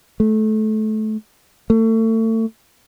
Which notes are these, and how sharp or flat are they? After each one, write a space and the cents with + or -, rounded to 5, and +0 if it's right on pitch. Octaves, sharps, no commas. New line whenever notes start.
A3 -25
A3 +30